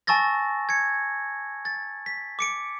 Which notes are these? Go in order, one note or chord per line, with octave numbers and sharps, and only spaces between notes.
G#5 A5 C#6 E6 A6 A#6
G#6 C#7
A6
B6
D6 C#7 D7